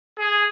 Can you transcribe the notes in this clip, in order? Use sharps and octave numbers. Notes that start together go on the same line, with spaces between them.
G#4